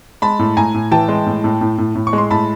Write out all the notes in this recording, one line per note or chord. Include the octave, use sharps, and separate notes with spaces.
G#3 A5 B5
A2
A2 G#5 A#5
A2
E3 G5 A5
G#3
A2
A2
A2
A2
A2
C#6
G#3
C6
A2 A5 B5